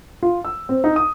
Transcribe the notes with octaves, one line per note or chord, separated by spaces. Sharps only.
F4
E6
C4
D#4
D#6